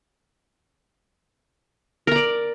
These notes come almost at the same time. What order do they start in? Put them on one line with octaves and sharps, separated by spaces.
A#4 A#5 D5